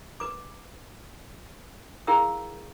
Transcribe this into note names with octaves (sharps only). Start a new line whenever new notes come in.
B4 D6
E4 G#4 A#4 F5 G5 E6